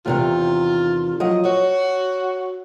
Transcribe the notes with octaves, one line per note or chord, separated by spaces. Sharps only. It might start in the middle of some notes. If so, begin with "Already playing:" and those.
E2 C3 D#3 F4
F3 F#3 D#5
F#4 C#5